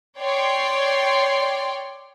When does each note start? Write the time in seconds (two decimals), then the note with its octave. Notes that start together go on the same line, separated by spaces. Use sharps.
0.18 C#5 D5 G5 C6